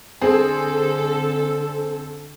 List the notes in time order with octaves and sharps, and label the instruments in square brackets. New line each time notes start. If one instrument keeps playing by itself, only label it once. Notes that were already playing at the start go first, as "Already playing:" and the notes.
[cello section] D3 A4 [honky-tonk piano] C4 G#4